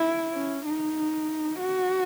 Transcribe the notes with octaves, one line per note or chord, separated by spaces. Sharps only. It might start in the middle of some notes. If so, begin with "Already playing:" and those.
Already playing: E4
C#4
D#4
F#4